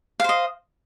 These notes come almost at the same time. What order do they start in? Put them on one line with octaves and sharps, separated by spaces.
F5 C5 D#5